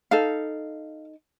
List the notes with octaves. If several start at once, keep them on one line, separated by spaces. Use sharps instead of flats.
D#4 A4 F5